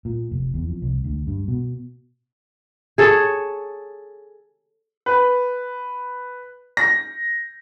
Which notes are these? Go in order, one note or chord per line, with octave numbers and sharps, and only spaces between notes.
A#2
F1
E2
F2
C2
D2
G2
B2
G#4 A4 C#5
B4
A#6